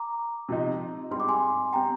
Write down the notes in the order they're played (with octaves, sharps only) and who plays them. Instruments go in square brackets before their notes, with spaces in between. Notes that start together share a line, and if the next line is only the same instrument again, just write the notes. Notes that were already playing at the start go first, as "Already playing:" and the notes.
Already playing: [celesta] A#5 D6
[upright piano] C3 F3 C4 D#4
[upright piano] G#2 G3 C4 [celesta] C6
[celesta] D6
G#5 C6
[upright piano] G3 C4 [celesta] G5 A#5